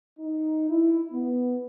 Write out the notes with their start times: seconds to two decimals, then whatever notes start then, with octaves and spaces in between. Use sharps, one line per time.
0.19 D#4
0.70 E4
1.12 B3